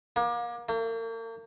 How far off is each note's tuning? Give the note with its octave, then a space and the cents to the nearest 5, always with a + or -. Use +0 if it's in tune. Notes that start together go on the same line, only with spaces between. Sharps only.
A#3 +35
A#3 -40